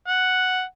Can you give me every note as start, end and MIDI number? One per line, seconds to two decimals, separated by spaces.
0.08 0.62 78